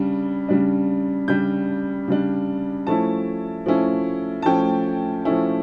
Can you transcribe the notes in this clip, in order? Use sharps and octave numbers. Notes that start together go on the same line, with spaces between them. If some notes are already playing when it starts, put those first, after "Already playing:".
Already playing: C#3 G3 D4
C#3 G3 D4
C#3 G3 D4 G6
C#3 G3 D4
F3 A3 C#4 E4 A5
F3 A3 C#4 E4
A5
F3 A3 C#4 E4 G5
F3 A3 C#4 E4